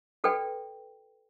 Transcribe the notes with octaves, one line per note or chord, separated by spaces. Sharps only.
F#4 A4 B4 D5 G5